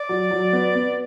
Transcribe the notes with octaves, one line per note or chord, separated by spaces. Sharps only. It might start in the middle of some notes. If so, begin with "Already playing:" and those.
Already playing: D5
F#3
F#3
B3
B3